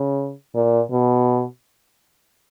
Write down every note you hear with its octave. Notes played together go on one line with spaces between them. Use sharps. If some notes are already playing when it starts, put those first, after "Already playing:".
Already playing: C#3
A#2
B2